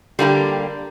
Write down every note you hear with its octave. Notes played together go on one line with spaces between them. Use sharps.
D3 G3 A#3 E4 G4